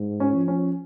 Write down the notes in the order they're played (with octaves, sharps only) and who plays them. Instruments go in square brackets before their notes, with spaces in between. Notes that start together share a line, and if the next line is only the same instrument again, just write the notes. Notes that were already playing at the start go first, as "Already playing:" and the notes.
Already playing: [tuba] G#2
[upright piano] C#4
[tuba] F3
[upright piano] C#4